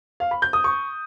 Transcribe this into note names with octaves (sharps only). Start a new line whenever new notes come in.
F5
B5
G6
D#6
C#6